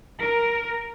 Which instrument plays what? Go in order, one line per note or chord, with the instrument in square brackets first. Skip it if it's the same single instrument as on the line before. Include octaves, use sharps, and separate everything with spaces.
[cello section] A#4